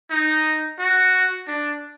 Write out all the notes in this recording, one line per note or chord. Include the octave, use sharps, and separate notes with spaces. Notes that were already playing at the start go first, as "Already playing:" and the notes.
D#4
F#4
D4